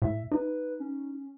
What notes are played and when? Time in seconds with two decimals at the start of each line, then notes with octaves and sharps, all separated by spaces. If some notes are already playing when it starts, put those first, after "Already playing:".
0.02 A2 E5
0.32 D#4 B4
0.80 C#4